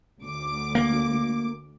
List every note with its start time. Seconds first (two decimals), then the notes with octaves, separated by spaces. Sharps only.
0.22 D2 D6
0.75 A#3